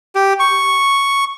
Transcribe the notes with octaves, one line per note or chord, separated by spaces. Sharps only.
G4
C#6